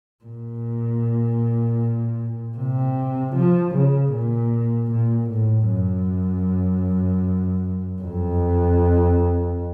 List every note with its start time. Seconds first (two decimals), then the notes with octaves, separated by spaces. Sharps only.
0.24 A#2
2.57 C3
3.36 F3
3.75 C#3
4.12 A#2
4.91 A#2
5.30 A2
5.69 F#2
8.02 F2